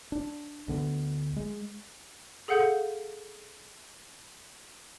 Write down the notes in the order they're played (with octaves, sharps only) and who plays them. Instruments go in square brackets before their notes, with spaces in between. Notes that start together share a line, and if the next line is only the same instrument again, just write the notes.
[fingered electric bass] D4
D2 D3 B3
G#3
[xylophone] G#4 A4 F5 F#5 G6